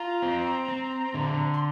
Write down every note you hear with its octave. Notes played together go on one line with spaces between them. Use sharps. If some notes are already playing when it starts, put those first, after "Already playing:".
Already playing: F4 A#5
C4
C4
D3
C6